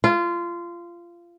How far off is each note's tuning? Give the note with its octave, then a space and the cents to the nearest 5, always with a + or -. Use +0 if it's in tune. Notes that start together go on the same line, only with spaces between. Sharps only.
F4 -20